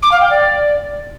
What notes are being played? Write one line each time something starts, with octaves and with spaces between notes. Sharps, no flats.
D6
F5
G5
D5